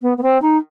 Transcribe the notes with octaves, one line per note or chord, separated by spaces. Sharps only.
B3
B3
C4
D#4